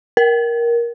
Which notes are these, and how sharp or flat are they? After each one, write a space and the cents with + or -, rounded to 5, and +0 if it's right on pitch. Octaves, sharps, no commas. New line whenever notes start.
A#4 +15